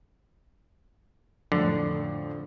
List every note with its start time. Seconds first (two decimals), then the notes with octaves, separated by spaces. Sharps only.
1.52 F2 A2 D3